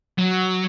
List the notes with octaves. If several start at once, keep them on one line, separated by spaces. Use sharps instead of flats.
F#3